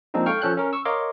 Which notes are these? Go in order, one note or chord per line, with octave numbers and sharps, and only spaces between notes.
F3 G#3 A#3 C4 D4 D#4
A4 F5 G5 C#6 F6
F3 C#4 A4 C#5 F#6 G6
C#4 A#4
C#6 E6
A#4 C#5 D#5 F5 C6 D6